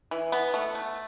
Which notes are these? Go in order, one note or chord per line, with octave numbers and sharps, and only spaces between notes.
E3
B3
A3
A3